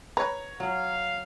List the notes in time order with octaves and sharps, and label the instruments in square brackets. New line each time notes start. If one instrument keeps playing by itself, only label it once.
[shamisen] B4 [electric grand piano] C#5 A#5
[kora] F#3 [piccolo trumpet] F5